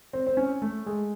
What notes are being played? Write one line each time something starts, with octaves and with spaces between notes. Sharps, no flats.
C4
C4
C#4
A3
G#3